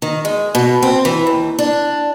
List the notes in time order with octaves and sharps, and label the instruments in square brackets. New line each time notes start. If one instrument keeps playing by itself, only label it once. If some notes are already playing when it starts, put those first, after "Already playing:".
[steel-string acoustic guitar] D#3
G#3
B2
C4
E3
D#2
D4